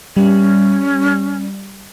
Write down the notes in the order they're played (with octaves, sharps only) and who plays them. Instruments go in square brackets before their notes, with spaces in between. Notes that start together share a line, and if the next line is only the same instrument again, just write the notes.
[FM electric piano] G3 [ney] C#4